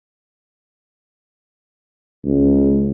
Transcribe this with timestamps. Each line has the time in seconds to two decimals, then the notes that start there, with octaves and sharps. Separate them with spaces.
2.24 C#2